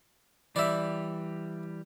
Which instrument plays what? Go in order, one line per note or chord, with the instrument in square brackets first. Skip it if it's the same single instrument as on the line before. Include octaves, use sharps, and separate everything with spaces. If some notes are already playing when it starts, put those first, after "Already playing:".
[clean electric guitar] E3 G3 [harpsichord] D5 E5